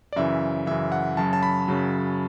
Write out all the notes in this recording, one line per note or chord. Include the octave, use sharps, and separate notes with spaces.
D5
F#2 C#3 E3 E5
F#2 C#3 E3 E5
F#5
F#2 C#3 F#3 A5
A5
B5
F#2 C#3 F#3